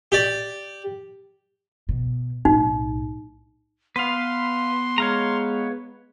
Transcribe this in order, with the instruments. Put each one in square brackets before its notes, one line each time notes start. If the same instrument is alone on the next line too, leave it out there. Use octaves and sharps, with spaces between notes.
[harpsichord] G4 D5
[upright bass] B2
[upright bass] B1 A2 [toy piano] D#4
[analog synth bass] B3 [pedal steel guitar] B4 F5 [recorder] C6
[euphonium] G#3 [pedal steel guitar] C#5 F5 A#5